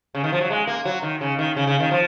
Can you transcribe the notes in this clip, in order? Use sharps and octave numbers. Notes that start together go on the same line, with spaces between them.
C#3
D#3
F3
F#3
G#3
A#3
F#3
D#3
C#3
D#3
C#3
C#3
D#3
F3